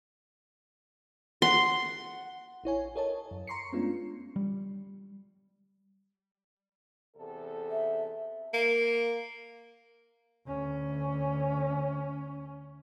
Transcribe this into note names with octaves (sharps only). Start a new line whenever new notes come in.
F#5 C6
A1 E4 C#5 G#5
A4 A#4 C#5 D#5 A5
F#2
A#5 C6 C#6 C7 C#7
G#3 A3 B3 C#4 D4 F4
G3
E2 C3 A4
E5
A#3
D2 C#4